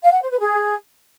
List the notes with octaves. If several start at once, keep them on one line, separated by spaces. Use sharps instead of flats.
F5
F#5
C5
B4
G#4